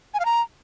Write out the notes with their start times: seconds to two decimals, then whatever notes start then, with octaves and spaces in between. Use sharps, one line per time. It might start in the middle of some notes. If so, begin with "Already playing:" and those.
0.14 G#5
0.20 F5
0.25 A#5